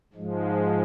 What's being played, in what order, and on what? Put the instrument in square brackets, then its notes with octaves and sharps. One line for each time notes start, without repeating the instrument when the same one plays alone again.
[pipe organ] G#2 F3 G#3